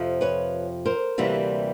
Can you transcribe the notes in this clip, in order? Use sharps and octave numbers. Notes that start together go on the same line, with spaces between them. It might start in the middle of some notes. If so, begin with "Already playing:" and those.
Already playing: F2 C3 F3
B4 C#5
A#4 C5
D2 C3 E3 G3 A#3